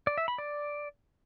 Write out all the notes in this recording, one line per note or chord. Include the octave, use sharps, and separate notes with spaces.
D5
E5
B5
D5